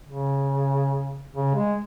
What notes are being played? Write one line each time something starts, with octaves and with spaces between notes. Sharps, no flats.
C#3
C#3
G#3